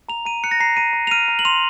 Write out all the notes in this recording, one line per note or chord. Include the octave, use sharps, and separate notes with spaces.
A#5 F7
A#5 D#7
F#6 C#7
A#6
A#5 C7
A#5 D#7
A#5
F7
F6 D#7
A#5
F#7
C6 F7